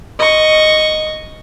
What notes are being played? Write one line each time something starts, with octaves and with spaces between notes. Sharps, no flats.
D#5 C#6